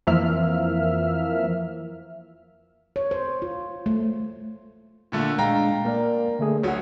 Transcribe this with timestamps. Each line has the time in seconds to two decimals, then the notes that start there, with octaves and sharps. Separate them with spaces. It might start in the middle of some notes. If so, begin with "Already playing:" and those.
0.07 F2 E3 F3 A#3 E5 F6
2.96 C#5
3.11 C5
3.42 F4
3.86 A3
5.12 A#2 D3 A3
5.38 A#2 G#3 D4 F5 G5 A#5
5.85 A#3 A#4 D5
6.39 D3 A3 G#4
6.63 D2 F#3 C#5 F#5